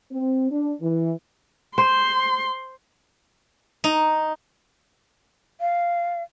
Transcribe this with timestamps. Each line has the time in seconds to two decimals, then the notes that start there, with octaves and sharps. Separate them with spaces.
0.11 C4
0.50 D4
0.81 E3
1.78 C5 C6
3.84 D#4
5.61 F5